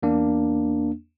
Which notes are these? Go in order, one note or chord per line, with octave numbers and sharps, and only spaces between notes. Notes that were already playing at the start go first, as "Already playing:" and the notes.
E2 A#3 D4